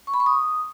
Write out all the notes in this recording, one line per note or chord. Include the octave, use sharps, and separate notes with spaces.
C#6
B5
C#6
D#6